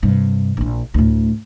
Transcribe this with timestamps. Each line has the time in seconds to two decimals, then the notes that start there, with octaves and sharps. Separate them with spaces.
0.02 G2 C3
0.57 A#1 E4
0.94 D2 A2